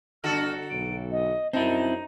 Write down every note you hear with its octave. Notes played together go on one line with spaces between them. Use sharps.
G1 D3 D4 F#4 A4 A5 F6
B1 D7
D#5
F#2 C4 D#4 E4 A5